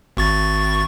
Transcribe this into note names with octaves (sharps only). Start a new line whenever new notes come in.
G#1 C#6 A6